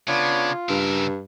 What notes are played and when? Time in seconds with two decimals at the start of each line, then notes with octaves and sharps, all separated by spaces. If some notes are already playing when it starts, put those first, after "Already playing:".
0.08 C#3 B3 D4 F4 C#5
0.69 G2 C#3 A#4 E6